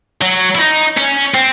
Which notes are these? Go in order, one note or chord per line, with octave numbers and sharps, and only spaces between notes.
F#3
E4
D#4
C#4
C4